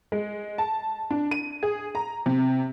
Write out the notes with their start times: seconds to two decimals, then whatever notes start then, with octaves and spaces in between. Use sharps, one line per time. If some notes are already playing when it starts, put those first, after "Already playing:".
0.12 G#3
0.58 A5
1.11 D4
1.31 D#7
1.63 G#4
1.95 A#5
2.26 C3